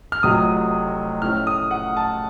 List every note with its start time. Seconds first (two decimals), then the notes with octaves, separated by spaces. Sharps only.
0.12 F6
0.23 F1 F2 C3 F#3 A3 D#6
1.22 A2 A3 C#4 F6
1.47 D#6
1.71 F#5
1.97 A5